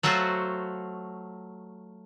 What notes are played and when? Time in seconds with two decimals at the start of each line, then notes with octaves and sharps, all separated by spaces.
0.03 F#3 A3 F4 F#4 C5